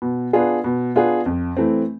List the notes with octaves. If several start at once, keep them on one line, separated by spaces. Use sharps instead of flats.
B2
B3 D4 F4 G#4
B2
B3 D4 F4 G#4
F2
E3 A3 C4